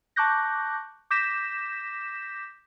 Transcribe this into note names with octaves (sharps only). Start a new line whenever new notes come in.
A5 C#6 D6 F#6 G6 A#6
D6 G6 A#6 B6 E7